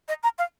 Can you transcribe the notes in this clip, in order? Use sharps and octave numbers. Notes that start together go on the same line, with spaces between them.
D#5
A#5
F5